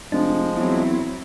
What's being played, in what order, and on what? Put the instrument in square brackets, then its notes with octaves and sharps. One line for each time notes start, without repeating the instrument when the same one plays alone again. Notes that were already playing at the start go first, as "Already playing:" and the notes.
[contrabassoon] F1 [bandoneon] F3 G#3 [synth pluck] D4
[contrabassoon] E2 [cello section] F#3 C4 E4